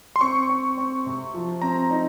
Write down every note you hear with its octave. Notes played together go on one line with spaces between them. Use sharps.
C6
C4 C#6
C4
C4
C3
F3
C4 A#5
D#4